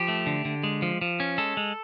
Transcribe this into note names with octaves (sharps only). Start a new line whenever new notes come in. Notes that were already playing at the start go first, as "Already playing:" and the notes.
Already playing: F3 G4
A3
D3
D3
G#3
F3
F3
C#4
G#3 A4
G#3